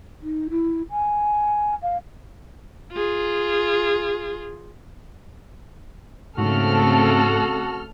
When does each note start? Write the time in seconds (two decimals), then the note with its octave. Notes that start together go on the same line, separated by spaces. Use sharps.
0.22 D#4
0.50 E4
0.90 G#5
1.82 F5
2.92 F4 G#4
6.38 G#2 C#3 A3 C4 F#4 A4 F6